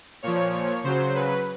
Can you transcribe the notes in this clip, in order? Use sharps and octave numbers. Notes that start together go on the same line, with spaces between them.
A#2 F3 C#5
C#3 F#3 C5
B4